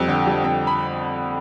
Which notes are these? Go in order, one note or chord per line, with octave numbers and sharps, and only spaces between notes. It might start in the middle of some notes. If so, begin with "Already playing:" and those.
Already playing: F2 G3 F#5
D3 G5
G3
F2 G5
B5